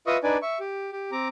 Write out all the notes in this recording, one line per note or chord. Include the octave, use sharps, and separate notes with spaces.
F4 B4 D#5 E5 C#6 D#6
D4 D#4 B4 D5 G#5
E5 C#6
G4
G4
C4 A#5 D6